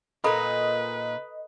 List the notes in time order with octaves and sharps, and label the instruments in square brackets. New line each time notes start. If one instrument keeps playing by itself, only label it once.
[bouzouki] A#2 D#4 [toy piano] A4 A#5 B5 [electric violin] B4 [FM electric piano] D#5